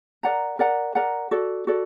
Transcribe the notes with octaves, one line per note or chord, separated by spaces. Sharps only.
A#4 D5 F#5 A#5
A#4 D5 F#5 A#5
A#4 D5 F#5 A#5
F#4 A4 D5
F#4 A4 D5